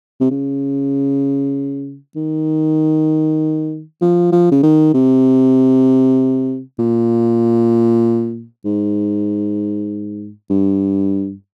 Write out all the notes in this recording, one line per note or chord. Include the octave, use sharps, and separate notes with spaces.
C3
C#3
D#3
F3
F3
C#3
D#3
C3
A#2
G#2
G2